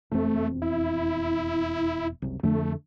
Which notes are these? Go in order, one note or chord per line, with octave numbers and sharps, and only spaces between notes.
E1 F2 A3 C4
E4
F#1 C2
F2 D3 A3 D4